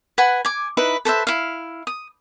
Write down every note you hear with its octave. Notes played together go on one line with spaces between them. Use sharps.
B4 F#5 G#5
G#5 D6
D#4 E4 B4
A4 B4 C5 E5
E4 F5
D#6